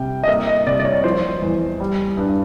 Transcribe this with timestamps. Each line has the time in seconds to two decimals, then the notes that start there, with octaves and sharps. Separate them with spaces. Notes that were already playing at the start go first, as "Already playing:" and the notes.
Already playing: C3 G3 G5
0.23 D#5
0.28 A#3 E5
0.47 D#5
0.67 C3 D5
0.80 D5
0.85 C#5
1.04 F3 C5
1.42 E2
1.80 G3
2.17 G2